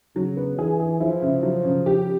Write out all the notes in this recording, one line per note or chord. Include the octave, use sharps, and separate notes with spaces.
C#3 F#3
B3
E3 G#4
G#4
F3 E4
C#3
F#3
C#3
G4